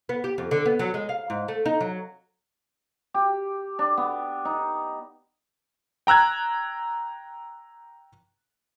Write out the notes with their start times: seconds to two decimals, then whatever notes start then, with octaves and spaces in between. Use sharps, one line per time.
0.09 B3
0.24 G4
0.38 F2
0.51 D3
0.66 B3
0.79 F#3
0.94 G#3
1.09 F5
1.30 G#2
1.48 A3
1.66 D#4
1.81 F#3
3.14 G4
3.79 D4
3.97 B3
4.45 D#4
6.07 G5 A#5 E6 F#6 G#6